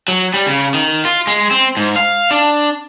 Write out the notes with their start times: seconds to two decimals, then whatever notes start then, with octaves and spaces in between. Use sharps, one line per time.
0.08 F#3
0.34 G3
0.47 C#3
0.74 D#3
1.05 F4
1.27 G#3
1.51 C4
1.77 G#2
1.96 F5
2.31 D4